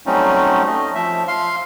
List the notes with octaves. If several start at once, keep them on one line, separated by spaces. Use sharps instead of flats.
F#3 G3 A3 C4 C#4 D#4
A3 D#5
F3 E5
F5 C6